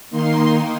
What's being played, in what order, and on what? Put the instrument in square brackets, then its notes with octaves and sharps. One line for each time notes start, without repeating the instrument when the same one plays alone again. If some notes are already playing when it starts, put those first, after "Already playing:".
[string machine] D#3 A#3 D#4 C6